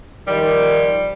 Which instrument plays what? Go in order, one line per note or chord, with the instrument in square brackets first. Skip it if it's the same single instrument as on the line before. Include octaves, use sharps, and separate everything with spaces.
[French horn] D#3 [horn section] F3 G3